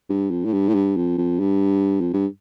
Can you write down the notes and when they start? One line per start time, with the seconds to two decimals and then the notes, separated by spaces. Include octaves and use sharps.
0.09 G2
0.31 F2
0.45 A2
0.53 G2
0.68 A2
0.74 G2
0.97 F2
1.18 F2
1.40 G2
2.01 F2
2.13 G2